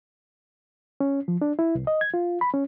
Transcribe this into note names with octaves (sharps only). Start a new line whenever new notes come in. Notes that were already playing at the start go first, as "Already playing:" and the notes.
C#4
F3
D4
E4
C2
D#5
G#6
F4
B5
C#4